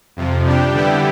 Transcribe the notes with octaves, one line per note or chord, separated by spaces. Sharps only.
F2 C3 F3
C3 G3 D4 G4
D3 G3 B3 E4 G4